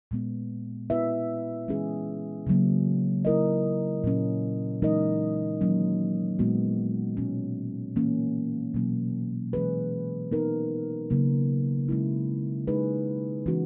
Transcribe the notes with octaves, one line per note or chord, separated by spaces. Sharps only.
A#2 G#3 B3
B3 E4 B4 E5
E3 G#3 C#4 G#4
C#3 F#3 A#3
A#3 E4 A#4 D#5
A#2 F#3 C#4
E3 G#3 D#4 A#4 D#5
D#3 F#3 A#3 C#4
A#2 G#3 B3 F#4
B2 G#3 C#4
E3 A#3 C#4
B2 F#3 A#3 C#4
E3 G#3 C#4 G#4 B4
B3 D#4 A#4
C#3 F#3 A#3
G#3 C#4 E4
G#3 D#4 G#4 B4
E3 G#3 C#4 F#4